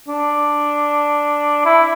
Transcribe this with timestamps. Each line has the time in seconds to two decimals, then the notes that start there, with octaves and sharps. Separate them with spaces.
0.08 D4
1.66 E4